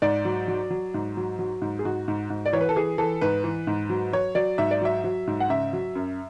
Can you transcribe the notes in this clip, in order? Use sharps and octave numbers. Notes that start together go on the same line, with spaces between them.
G#2 D5
F#3
F#3
F#3
G#2
F#3
F#3
G#2
G#4
G#2 F#4
G#2
G#2
D5
E3 C#5
B4
A4
E3 G#4
E3 A4
G#2 B4
E3
G#2
F#3
F#3 C#5
F#3 D5
G#2 E5
D5
F#3 E5
F#3
G#2
F#5
C#3 E5
F#3
F#2